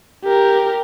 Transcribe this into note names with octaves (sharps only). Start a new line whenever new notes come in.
G4 A#4